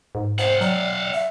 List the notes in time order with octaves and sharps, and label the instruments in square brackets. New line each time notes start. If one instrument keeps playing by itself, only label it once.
[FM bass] G#2
[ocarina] C5 [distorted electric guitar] F5 F#5
[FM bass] F#3 [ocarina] D5
[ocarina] E5